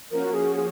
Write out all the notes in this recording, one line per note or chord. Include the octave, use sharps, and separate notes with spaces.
F3 A#3 C#4 F#4 A#4
G#4
G#4